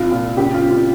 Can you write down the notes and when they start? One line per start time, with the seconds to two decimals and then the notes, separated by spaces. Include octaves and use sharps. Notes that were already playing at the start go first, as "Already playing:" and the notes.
Already playing: C2 F4
0.12 A#2 F4
0.36 C#3 G4
0.54 F4
0.62 C#3
0.71 F4